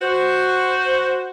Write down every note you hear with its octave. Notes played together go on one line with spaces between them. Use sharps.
F#4 C5